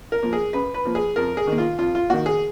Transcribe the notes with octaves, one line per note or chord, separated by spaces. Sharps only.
A#4
F3 A#3
G#4
F#2 B4
B4
F3 A#3
G#4
F2 A#4
G#4
D#3 A#3
F4
F2 F4
F4
D#3 A#3 F#4
G#4